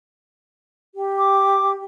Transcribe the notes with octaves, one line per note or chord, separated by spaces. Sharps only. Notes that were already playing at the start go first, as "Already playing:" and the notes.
G4
D6